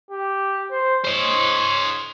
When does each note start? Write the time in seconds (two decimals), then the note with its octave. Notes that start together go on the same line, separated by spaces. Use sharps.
0.11 G4
0.71 C5
1.05 C5 C#5 D#5